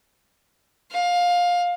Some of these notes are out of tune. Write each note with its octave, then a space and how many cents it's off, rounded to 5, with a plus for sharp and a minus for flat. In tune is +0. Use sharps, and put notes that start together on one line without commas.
F5 +20